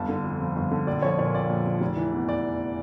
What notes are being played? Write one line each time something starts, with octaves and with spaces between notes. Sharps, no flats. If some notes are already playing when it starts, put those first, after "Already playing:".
Already playing: G1 A5
D3
F2
F3
G1
D3
A#1 D5
F3 C#5
A#2 C#5
A#1 D5
A#1
F3
F1
E3
E2
D5